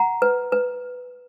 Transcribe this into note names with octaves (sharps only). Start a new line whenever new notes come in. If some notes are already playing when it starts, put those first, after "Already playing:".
Already playing: F#5 A#5
B4
B4